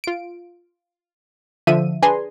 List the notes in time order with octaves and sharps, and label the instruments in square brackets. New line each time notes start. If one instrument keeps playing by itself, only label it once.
[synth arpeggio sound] F4 D7
D3 F3 E5 D#7
D4 G#4 B4 G#5 A#5 C6